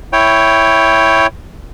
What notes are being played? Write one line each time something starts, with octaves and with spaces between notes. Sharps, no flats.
E4 C#5 G5